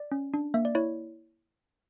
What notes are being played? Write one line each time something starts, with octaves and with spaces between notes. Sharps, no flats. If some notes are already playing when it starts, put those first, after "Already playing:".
Already playing: D5
C#4
D4
A#3 E5
D5
E4 C#5